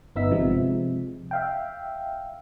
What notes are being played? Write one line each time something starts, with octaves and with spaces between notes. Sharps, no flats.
G1 B3 D#4 E5 E6 B6
C3 F3 G#3
E5 F5 G5